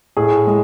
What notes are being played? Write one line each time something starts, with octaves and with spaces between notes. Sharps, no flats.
A2 G#4
G#3